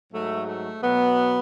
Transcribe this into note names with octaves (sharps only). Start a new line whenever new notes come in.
G#2 F#3 A3
A3
B2 F#3 B3